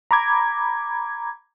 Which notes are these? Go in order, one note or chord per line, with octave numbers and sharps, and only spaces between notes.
A#5 B5 D6 G#6